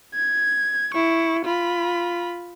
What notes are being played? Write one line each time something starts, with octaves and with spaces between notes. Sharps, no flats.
G#6
E4 C#6
F4 B5